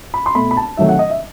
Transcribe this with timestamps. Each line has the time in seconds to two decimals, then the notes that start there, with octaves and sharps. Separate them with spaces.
0.14 B5
0.26 C6
0.35 B2 A3 B5
0.51 B5
0.57 A5
0.77 C3 D#3 F#3 A3 E5
0.89 F#5
0.99 D#5
1.10 E5